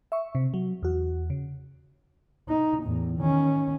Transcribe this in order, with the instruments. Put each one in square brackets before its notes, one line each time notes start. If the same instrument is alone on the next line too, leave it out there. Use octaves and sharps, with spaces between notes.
[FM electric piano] E5 C#6
C3
F#3
E2 F#4
C#3
[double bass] D#4
E2 A2
D#3 C#4